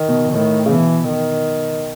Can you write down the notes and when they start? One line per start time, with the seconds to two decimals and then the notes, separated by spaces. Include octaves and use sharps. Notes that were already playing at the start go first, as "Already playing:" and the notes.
Already playing: D#3
0.08 B2
0.33 A2 D#3
0.66 C#3
0.71 B2 E3
1.08 D#3